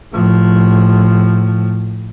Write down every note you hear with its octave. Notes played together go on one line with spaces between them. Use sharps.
A2 F3